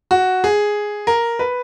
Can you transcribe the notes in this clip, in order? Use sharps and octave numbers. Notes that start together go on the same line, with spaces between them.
F#4
G#4
A#4
B4